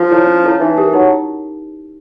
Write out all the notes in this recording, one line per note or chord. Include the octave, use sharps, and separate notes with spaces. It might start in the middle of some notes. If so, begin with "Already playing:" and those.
Already playing: F3
E4 A4 C#5
C#4
E4 A4 C#5
E3 D#4
G4 A#4
F#3 D#4